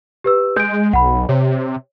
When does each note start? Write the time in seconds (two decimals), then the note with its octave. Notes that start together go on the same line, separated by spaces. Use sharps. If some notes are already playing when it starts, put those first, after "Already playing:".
0.24 G4 B4 E6
0.56 G#3 G6 D7
0.93 B1 F#5 B5
1.29 C3 C#5